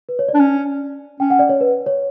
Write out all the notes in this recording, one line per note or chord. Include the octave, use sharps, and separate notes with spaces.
B4
C#5
D5
D4
C#4
C#4 G5
F#5
D5
C#5
B4
C#5